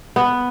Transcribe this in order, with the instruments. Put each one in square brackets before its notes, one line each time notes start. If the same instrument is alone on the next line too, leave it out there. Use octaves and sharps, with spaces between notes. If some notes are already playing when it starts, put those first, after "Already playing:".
[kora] B3